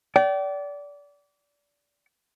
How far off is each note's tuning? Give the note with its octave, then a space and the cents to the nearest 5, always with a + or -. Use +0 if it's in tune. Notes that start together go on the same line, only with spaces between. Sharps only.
D5 -25 G5 -40